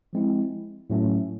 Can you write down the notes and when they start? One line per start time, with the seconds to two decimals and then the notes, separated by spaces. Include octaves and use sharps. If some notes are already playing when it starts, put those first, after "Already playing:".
0.13 F3 G#3 C4 E4
0.90 A2 F#3 A3 C#4